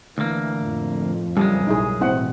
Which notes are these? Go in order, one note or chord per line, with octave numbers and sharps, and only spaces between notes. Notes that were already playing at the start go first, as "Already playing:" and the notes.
D2 E3 A#3
F2 A2
F#2 C#3 G3 G#3
B1 D#4 E4 G#4
A1 B2 C4 E4 F#5